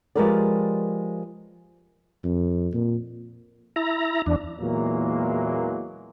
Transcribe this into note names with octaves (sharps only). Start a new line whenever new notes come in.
F3 G#3 G4 A#4 B4 D5
F2
A#2
E4 A#5
E2 D4
E2 A#2 E3 F#3 G#3 A#3